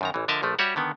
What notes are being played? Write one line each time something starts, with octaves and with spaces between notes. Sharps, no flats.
F#2 D#3 A#5
A1 E3
D3 F3 A#4 D#5 E5 A5
A#1 F3 A3
G3 F#4 G4 C#5 E5 F#5
D3 D#3 B3